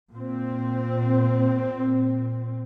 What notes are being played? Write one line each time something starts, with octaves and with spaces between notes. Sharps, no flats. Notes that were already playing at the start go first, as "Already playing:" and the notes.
A#2 C4